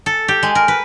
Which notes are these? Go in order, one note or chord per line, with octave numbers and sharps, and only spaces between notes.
A4
G4
G#3
A#4
B4